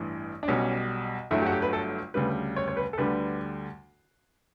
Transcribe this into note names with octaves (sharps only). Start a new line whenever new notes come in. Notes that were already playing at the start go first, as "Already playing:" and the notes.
Already playing: A1 G2 E3
D4
B1 B2 G3 C#4
G1 G2 F#3 A3 E4
G4
F#4
G4
B4
A4
D2 C#3 G3 B4
C#5
C#5
B4
A4
D2 D3 G3 B4